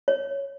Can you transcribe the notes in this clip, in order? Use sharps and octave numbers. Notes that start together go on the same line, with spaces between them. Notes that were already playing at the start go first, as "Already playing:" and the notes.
C#5